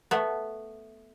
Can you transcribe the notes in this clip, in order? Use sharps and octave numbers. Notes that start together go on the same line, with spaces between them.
A3 B3